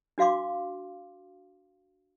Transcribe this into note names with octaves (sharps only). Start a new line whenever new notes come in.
D4 F#4 F5 C6 D6